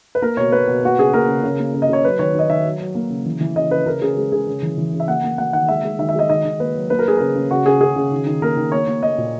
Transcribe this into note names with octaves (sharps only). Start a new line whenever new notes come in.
B4
A#3 A#4
B2 C#5
A#3 B4
B2
A#3 F#4
C#3 G#4
A#3 A#4
C#3
C#3
A#3
C#3
D#5
C#3 C#5
F#3 B4
D#3 C#5
D#3 D#5
D#3 E5
F#3
F#3
A#3
C#3
E3
E3
C#3 D#5
C#3 B4
C#3 A#4
C#3 G#4
G#3
C#3 G#4
C#3
E3
E3
C#3
E5
A#3 F#5
A#3
A#3 F#5
D#3 F#5
G#3 E5
G#3
D#3 E5
E5
G#3 D#5
D#3 D#5
D#3
A#3 B4
F#3
A#3 B4
A#4
F#3 G#4
C#3 A#4
C#3
C#3 F#4
C#3 G#4
C#3 G#4
C#3
D#3
D#3
A#3 A#4
D#3
A#3 C#5
A#3
A#3 D#5
A#2